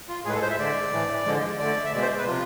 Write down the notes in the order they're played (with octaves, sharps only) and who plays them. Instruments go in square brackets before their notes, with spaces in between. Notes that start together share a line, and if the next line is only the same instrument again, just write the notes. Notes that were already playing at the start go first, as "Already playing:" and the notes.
[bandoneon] F4
A2 G#4
G#3 B4
A4
C5
E5
D3 G#3 D5
A2 E3 A3
D3 F3 G#3
D3 A3 D5
E5
B2 G#3 D5
C5
B4
C3 F3 F4